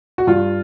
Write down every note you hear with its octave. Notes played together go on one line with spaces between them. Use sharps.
F#4
G2 F4